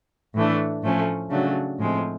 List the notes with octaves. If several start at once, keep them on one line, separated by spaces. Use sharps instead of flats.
A2 E3 A3 D4
A2 F3 A3 C#4
C#3 F#3 A3 D4
A2 F3 G#3 C4